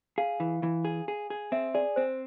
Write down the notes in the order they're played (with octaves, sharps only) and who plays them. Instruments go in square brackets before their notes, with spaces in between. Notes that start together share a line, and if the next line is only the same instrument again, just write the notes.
[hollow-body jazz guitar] G#4 [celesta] F5
[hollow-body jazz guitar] E3
E3
G#4
G#4
G#4
[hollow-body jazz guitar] C4 [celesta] E5
[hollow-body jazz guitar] G#4 [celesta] D5
[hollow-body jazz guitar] C4 [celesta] C5